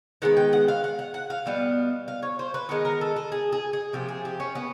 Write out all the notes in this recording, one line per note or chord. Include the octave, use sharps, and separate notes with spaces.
D#3 G#3 B3 F#5
G5
F#5
F5
F#5
F#5
F#5
F5
B2 G3 B3
F5
C#5
C5
B4
D#3 G#3 B3 A#4
A#4
A4
A4
G#4
G#4
G#4
C3 F3 A#3 G4
G#4
G4
C#4
B3